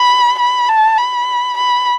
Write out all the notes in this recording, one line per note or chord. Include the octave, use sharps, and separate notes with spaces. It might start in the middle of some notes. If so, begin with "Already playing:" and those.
Already playing: B5
B5
A5
B5
B5